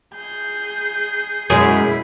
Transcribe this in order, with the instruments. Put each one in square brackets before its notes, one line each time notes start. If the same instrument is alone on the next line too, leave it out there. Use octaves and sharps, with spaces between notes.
[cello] G#4 [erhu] G6
[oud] F#2 G#3 [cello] B2 E4 [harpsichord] G#4